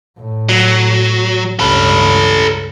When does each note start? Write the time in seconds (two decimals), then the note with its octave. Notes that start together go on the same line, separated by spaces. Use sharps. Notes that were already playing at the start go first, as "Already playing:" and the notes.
0.18 A2
0.49 F#3
1.60 C#2 G2 A4 B4